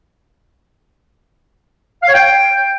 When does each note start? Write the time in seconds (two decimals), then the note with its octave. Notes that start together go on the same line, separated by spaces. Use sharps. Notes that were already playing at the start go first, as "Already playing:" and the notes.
2.03 F5
2.08 C#5
2.14 G5